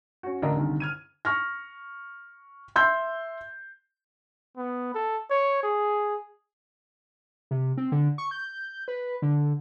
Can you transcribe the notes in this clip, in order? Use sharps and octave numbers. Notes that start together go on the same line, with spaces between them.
C#4 F#4
A1 D3 D4 A#4 D#5 A#5
C2 D3 D#3
F6 G#6 D#7
C#6 F6 A#6
E5 C6 E6 G6
B3
A4
C#5
G#4
C3
C4
D3
C#6
G6
B4
D3